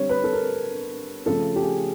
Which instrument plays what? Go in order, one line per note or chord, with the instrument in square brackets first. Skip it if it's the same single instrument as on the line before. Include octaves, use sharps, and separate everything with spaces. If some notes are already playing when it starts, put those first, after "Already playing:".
Already playing: [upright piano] D3 G3 C4 C#5
B4
A4
A#4
C#3 F3 A3 A4
G4
G#4